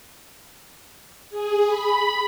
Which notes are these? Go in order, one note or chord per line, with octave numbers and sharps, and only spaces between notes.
G#4
B5